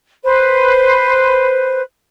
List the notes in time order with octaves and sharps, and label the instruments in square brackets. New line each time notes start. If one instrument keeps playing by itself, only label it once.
[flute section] B4 C5